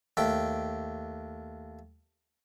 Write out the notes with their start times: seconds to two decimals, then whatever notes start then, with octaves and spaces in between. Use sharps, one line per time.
0.17 D#2 A3 G5